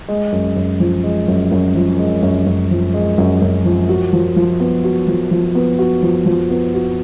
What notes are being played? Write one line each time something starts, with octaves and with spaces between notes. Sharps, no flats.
G#3
F#2
F#2
F3
G#3
F#2
F#2
F3
G#3
F#2
F#2
F3
G#3
F#2
F#2
F3
F#4
F3
F3
B3
F#4
F3
F3
B3
F#4
F3
F3
B3
F#4